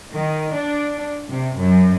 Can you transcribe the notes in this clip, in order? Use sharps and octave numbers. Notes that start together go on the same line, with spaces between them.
D#3
D4
C3
F#2